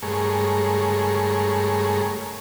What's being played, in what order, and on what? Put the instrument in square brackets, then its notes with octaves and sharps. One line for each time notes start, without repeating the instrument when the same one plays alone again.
[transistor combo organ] G2 G#3 A3 G#4 A#4 C#5